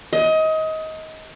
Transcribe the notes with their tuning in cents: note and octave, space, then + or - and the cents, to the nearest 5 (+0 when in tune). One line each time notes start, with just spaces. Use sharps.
D#5 +25